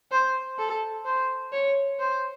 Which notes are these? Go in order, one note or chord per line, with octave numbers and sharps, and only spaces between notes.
C5
A4
C5
C#5
C5